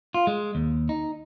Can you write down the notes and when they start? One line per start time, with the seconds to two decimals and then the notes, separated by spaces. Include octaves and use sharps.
0.14 F4
0.27 G#3
0.55 D#2
0.89 D#4